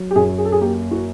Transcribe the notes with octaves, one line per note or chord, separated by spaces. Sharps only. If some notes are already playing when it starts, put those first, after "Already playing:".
Already playing: F#3
G4
F#2 G#4
G#4
A4
G#4
A#3 G4
F#4